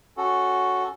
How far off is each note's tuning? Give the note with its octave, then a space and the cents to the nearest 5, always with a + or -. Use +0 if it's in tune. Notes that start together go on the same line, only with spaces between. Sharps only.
C#4 +5 F#4 +0 A4 +0